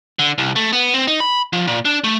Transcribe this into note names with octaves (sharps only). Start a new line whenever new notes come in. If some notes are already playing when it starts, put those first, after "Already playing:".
D3
C2
A3
B3
C4
D#4
B5
F3
A#2
D4
A3